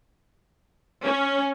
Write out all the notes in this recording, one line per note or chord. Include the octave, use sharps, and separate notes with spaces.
C#4